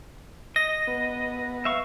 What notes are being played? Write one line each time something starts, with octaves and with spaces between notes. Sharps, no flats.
D#5 A#6
B3
E5 F5 C#6